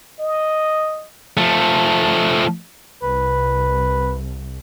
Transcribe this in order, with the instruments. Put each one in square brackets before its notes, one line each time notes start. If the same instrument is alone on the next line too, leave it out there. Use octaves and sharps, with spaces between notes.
[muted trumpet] D#5
[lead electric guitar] F3 A3
[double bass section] C2 [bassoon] B4